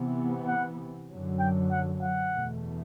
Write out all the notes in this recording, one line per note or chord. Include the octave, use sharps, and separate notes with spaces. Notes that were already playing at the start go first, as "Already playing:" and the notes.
Already playing: C3 E3 B3
F#5
F#2 D3 F#3
G5
F#5
F#5
E2 B2 A3